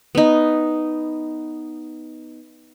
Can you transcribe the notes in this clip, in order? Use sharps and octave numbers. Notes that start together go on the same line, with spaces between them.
B3 D#4